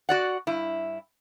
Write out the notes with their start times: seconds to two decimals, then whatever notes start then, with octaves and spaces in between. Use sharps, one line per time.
0.09 F#4 D5 F#5
0.47 G2 E4